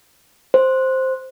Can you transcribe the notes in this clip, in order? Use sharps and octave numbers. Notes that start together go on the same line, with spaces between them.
C5